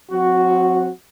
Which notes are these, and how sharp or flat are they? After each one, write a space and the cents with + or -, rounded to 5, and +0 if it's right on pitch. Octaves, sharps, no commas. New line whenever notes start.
F#3 -40 C4 +0 F#4 +0